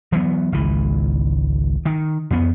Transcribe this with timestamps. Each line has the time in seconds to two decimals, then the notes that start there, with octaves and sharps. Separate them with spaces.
0.12 E3 F#3 A3 B3
0.52 G#1 C#2 E3
1.85 D#3
2.31 F2 B3